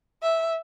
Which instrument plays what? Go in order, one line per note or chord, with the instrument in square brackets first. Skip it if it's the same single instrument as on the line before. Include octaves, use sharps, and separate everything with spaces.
[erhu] E5